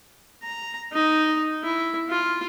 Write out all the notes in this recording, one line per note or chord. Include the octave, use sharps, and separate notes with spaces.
A#5
D#4
E4
F4